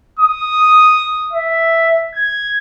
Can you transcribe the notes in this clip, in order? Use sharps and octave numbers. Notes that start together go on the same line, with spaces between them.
D#6
E5
G#6